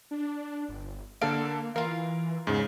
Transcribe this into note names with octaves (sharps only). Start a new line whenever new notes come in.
D4
G1
D3 A#3 A4 F5 D7
E3 F4 A#4 F5
E2 G#2 C#3